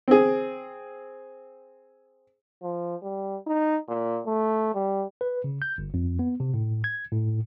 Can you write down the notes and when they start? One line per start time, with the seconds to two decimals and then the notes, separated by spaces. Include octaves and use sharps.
0.08 C4 G#4
2.63 F3
3.02 G3
3.47 D#4
3.89 A#2
4.26 A3
4.74 G3
5.21 B4
5.44 C#3
5.62 G6
5.78 G1
5.94 F2
6.19 B3
6.40 C3
6.54 A2
6.84 G#6
7.12 A2